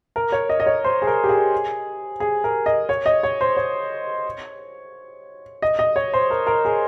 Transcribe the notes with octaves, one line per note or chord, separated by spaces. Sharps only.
A#4
C#5
D#5
D#5
C#5
C5
G#4
A#4
G4
G#4
G#4
A#4
D#5
C#5
D#5
C#5
C5
C#5
D#5
D#5
C#5
C5
A#4
A#4
G#4